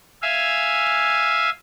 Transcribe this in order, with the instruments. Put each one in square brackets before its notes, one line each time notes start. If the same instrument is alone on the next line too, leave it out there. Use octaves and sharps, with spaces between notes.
[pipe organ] E5 F5 G#5